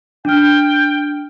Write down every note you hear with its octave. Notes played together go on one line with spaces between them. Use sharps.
D4 G5 F6